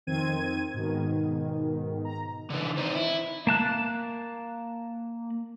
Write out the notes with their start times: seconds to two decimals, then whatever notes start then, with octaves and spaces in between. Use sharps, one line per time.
0.07 F2 D#3 C4 G#6 D#7
0.74 G#2 B2 D#3
2.05 A#5
2.50 D3 E3
2.77 C4 D#4
2.95 E4
3.47 A#3 A5 F#6